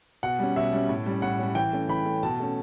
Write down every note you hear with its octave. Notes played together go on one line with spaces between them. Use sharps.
B2 F#5
G3 C#4
B2 E5
G3 C#4
A2
G3 C#4
A2 F#5
G3 C#4
E3 G5
A3 C#4
E3 B5
A3 C#4
B2 A5
A3 C#4